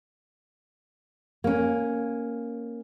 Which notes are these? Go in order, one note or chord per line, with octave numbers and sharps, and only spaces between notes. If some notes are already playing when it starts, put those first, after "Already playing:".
A#3 C#4